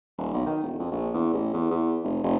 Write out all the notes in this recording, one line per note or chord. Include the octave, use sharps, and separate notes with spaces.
D#1
B1
D#3
E1
F2
A#1
E2
A1
E2
E2
F1
F1